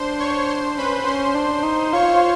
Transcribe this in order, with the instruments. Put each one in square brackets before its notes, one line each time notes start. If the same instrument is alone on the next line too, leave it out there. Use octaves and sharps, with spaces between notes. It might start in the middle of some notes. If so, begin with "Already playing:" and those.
Already playing: [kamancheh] D4 [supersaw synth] C5 C6
[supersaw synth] C#5 C#6
C5 C6
[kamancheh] C#4 [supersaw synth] B4 B5
[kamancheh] C#4 [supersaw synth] C5 C6
[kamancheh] D4
D#4
[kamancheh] F4 [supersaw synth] C#5 C#6